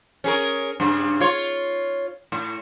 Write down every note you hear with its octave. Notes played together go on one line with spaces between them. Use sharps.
C#4 G#4 A#4
G2 C#3
F4 C#5
A2